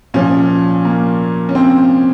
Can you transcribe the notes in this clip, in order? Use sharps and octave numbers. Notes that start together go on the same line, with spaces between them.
A#2 F3 C#4
A#3
C#4
C4